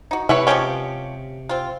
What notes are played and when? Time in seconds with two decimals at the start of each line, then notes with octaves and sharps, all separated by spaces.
0.11 D#4 F#4
0.29 C3 G3 E4 B4 C#5
0.47 F3 G#3 C#4 G4 C#5
1.49 C4 F4